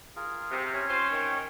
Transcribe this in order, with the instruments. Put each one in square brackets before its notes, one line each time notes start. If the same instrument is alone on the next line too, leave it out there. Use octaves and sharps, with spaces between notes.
[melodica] F4 G#4 A#4
[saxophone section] C3
[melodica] C#4 C#5
[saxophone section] F4 C5
D#3